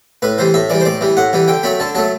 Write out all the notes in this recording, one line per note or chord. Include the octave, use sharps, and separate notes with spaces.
A2 B4
E3 G3 C5
A2 E5
E3 G3 D5
C5
A2 D5
E3 G3
A2 F#5
E3 G3
D3 G5
F#3 A3 B5
D3 A5
F#3 A3 A5